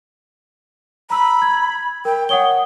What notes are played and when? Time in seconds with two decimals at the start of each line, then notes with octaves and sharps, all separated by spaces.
1.10 A#5 B5 E6
1.42 G#6
2.05 A#4 G5
2.29 C#5 F#5 D#6 G7